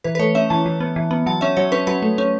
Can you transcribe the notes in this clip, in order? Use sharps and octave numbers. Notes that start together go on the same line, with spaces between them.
E3 B4
B4
A3 C#5
C#4 E5
E3 A5
E3
B3
E3
B3
F#3 A5
C#4 E5
F#3 C#5
C#4 B4
F#3 B4
A3
C#4